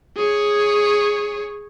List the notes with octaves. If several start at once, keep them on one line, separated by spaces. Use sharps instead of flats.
G#4 C#5